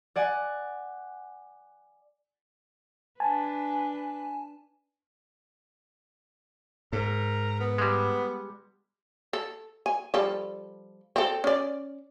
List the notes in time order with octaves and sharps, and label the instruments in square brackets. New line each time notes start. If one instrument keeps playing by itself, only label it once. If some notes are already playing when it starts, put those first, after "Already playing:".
[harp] D5 F#5 G#5
[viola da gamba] D4 B4 [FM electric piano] G#5 A5
[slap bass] G#2 [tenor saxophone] A#4
[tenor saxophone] B3
[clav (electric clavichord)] G3 G#3
[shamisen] A4
G#5
F3 G3 A4
C4 A4
C#4 D5